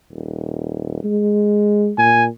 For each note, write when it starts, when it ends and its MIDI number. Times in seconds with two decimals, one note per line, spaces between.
0.11 1.02 27
1.04 1.91 56
1.98 2.28 46
1.98 2.25 80